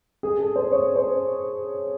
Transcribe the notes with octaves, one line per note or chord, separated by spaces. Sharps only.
G#4
A4
C5
C#5
C5